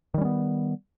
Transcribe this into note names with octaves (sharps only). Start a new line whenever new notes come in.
D#3 G3 B3 C#4